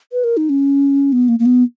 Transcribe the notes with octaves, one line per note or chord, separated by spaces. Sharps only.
B4
A#4
D#4
C#4
B3
A#3
A#3
B3